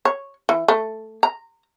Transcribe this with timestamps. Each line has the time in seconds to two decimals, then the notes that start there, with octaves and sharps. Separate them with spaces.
0.05 C#5
0.49 E3
0.68 A3
1.23 A#5